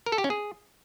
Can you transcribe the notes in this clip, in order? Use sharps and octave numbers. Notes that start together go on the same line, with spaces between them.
A#4
A4
G4
C#4
G#4